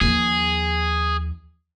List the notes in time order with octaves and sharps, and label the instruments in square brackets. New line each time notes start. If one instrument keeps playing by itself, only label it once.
[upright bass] D#2 F3 [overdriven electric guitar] G#4